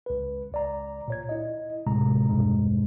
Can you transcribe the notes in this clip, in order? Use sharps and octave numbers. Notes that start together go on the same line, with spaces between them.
C#2 B4
C#2 D5 A#5
A#2 C#5 G#6
E4 D#5
D2 A2 C3 G#3 A#5
A#1 E2 G2 B2 G#3